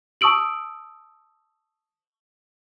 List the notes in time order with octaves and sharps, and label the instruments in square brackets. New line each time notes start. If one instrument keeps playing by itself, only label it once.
[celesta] A5 C#6 D#6 E6 D7 F#7